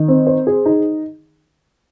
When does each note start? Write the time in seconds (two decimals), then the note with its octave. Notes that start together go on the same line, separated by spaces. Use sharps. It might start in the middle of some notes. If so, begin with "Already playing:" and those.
Already playing: D#3
0.08 C4
0.27 C5
0.47 G#4
0.66 D#4